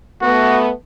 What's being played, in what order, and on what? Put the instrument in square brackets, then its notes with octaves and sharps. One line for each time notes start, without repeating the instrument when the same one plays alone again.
[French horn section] A3 B3 [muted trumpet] F#4